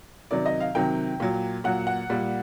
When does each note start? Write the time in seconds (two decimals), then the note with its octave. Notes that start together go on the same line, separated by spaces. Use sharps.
0.31 C3 D#3 F#3 D5
0.46 D#5
0.60 F5
0.75 C3 D#3 F#3 G5
1.20 A#2 F#3
1.64 A#2 F#3 F#5
1.87 F#5
2.10 A#2 G3